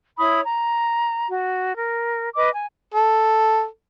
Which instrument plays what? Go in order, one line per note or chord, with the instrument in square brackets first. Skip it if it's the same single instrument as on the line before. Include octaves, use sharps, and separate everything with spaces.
[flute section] E4 C#5 B5 D#6
A#5
F#4
A#4
B4 D#5 D6
G#5
[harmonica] A4